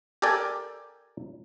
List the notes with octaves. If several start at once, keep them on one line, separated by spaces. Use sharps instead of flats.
G4 A4 A#4 D5 G5 G#5